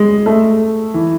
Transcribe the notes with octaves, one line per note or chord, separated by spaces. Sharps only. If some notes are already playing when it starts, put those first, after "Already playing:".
Already playing: G#3
A3
E3